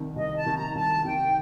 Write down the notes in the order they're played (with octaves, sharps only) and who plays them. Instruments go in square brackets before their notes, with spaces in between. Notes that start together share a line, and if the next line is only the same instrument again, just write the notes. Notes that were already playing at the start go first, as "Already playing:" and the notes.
Already playing: [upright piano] C2 C3 D#3
[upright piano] C2 [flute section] D#5
[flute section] A5
[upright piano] C3 D#3
[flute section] A#5
[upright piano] C2 [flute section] A5
[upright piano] C3 D#3 [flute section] G5